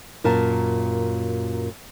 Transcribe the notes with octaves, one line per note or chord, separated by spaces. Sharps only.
F#2 A#2 A#4 A5